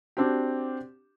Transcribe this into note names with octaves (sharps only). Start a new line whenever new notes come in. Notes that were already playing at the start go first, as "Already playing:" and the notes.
C4 D4 F#4 G4